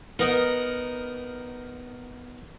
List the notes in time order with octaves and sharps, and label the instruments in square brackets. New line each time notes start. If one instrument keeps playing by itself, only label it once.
[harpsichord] B3 D#4 A#4